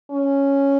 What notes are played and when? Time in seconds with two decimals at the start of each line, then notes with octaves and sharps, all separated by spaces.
0.11 C#4